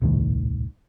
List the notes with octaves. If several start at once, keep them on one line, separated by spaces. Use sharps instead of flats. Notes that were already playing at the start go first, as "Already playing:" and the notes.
D#1 C2 A2 D#3